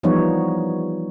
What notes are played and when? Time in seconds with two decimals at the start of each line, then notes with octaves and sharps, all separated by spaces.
0.03 E3 F3 G3 B3 D#4 C#5